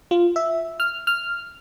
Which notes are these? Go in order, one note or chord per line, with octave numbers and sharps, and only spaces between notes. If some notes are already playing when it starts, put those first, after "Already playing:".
F4
E5
F6
F6